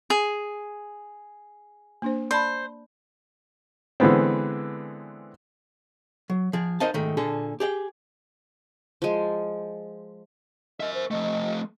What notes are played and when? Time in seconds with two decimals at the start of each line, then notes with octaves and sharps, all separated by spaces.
0.10 G#4
2.02 A#3 D4 C5
2.31 C5 D5 A5 B5
4.00 D3 E3 G#3 B3 C4
6.30 F#3
6.53 F3 G#4
6.80 D#4 A#4 C5 D#5 F5 A5
6.94 G#2 D#3 A3
7.17 A#2 D3 G#4 A4
7.60 G4 G#4 D5 G5
9.02 F3 G#3
10.80 A#4 D#5 E5
10.94 C5
11.11 F3 A3 D#5